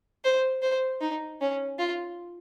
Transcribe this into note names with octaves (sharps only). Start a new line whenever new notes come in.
C5
C5
D#4
C#4
F4